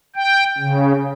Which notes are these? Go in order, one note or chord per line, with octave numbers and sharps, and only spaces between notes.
G5
C#3